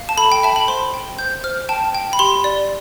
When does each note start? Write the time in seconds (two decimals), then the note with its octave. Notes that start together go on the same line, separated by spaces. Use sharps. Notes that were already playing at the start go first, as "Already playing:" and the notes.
Already playing: F5
0.09 A5
0.17 A4 B5
0.32 G5
0.43 E5 A5
0.56 B5
0.68 C5 C6
0.94 G5
1.19 C5 G6
1.44 C5 F6
1.69 G5 A5
1.95 G5
2.13 B5
2.19 G4 C6
2.44 D5